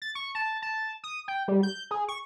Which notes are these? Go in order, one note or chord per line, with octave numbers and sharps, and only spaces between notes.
A6
C#6
A5
A5
D#6
G5
G3
G6
G#4
C#6